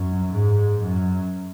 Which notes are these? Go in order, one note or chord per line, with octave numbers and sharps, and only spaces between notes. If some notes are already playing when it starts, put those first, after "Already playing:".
Already playing: F#2
G#2
F#2